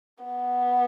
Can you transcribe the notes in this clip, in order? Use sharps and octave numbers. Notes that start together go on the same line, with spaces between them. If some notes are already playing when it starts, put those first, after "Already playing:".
B3